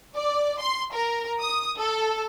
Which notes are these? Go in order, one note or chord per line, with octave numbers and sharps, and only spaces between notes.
D5
C6
A#4
D#6
A4